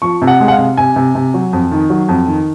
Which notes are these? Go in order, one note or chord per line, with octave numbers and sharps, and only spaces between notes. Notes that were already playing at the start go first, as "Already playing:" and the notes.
F3 C#6
C3
F#5
G#3
F#5
F5
C3
C3 G#5
C3
C3
F#3
F2
D#3
F#3
F2
D#3